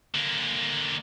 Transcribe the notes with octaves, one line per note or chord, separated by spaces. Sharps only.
D3 A#3